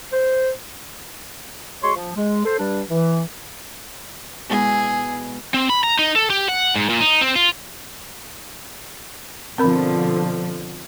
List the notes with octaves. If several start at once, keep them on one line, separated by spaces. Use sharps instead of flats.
C5
G#3 F#4 C#5 C6 C#6
F3
G#3
A4 C5
G2 G3 D4
E3
B2 G#3 E4 G#4
C4
B5
A#5
D#4
A4
G4
F#5
G#2
A#2
D#4
C4
F4
B2 D3 F3 C4 A#4 B5